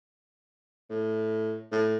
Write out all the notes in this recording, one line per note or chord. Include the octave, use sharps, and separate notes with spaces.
A2
A2